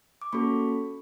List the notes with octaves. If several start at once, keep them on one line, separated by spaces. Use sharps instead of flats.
D6
A#3 C#4 F#4 A4 B5 C#6